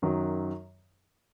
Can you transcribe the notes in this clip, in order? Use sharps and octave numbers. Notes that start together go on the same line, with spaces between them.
F#2 D#3 F#3